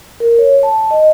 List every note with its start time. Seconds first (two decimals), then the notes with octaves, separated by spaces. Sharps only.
0.20 A#4
0.39 C#5
0.63 A5
0.91 D#5